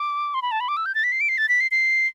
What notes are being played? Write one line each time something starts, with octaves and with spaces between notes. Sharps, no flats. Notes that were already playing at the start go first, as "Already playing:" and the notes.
Already playing: D6
C6
B5
A5
B5
D6
E6
G6
A6
B6
C7
D7
C7
A6
B6
C7
C7